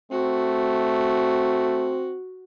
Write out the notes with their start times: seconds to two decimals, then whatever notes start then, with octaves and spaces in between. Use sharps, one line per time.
0.12 A3 C4 F#4